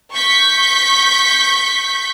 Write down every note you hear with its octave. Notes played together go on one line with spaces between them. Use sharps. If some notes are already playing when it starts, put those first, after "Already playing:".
C#6 G6 B6